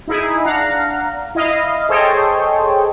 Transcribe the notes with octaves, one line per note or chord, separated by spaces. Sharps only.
D#4 E4 G#4
D4 F5 F#5 A#5
E4 D#5 F5
G#4 A4 C5 C#5 D#5 G5